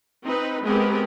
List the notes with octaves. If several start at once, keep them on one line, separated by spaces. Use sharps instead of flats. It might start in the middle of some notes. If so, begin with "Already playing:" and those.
C4 D#4 B4
G#3 B3 C4 G4 A#4 B4